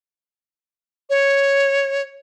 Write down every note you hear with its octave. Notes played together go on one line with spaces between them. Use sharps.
C#5